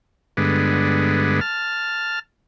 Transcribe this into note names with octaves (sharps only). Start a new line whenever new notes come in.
G2 D3 G#3 B3
A5 F6